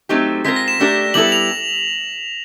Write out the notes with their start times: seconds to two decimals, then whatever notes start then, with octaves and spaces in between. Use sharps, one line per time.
0.09 F#3 A3 C4 D#4 G4
0.45 G#3 C4 F4 A#4 B6
0.56 A#6
0.68 E7
0.80 A3 D4 G4 A#4
1.14 G3 B3 E4 A4 F#7
1.32 F7